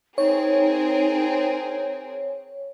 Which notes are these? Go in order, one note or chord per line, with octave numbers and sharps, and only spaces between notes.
C4 D#4 G#4 A#4 C#5